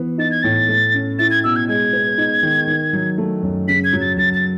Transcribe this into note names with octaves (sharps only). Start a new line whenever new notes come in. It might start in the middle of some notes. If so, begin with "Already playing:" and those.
Already playing: E3 B3
D#4 A6
G#6
A2 A6
A3
C#4
E4 A6
G#6
B2 E6
G#6
G#3 G#6
B3
D#4
D#3
D#3
F#3
A3
F#2
C#3 B6
G#6
F#3
A6
F#2 A6
A6